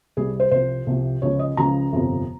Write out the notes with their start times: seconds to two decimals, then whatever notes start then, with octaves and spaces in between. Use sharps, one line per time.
0.17 C2 C3 G3 G#4
0.40 C5
0.51 C2 C3 F3 C5
0.87 C2 C3 F3
1.22 C#2 C#3 F3 C#5
1.39 D#5
1.57 C#2 C#3 F3 A#5
1.93 G1 F2 C3 F3